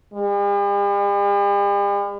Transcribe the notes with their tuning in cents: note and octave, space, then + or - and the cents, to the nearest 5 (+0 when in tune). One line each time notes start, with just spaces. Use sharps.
G3 +45